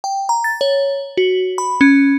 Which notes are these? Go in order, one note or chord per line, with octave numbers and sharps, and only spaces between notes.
G5
A#5
A6
C#5
F#4
B5
C#4